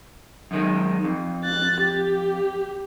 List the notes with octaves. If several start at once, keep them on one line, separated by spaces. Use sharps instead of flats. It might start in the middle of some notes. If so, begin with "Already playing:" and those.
F#2 D#3 G#3
F2
F#6 A6
G4